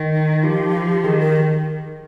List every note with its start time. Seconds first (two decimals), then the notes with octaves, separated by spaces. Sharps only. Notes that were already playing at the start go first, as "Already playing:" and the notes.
Already playing: D#3
0.14 D#4
0.43 F3 G4
1.04 D#3 G#4
1.19 A#4